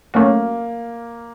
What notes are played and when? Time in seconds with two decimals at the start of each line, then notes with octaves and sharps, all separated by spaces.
0.14 F#3 A3 A#3 C#4 F#4